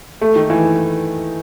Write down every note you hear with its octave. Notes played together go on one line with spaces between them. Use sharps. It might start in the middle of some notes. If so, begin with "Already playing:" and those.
A3
D#3
E3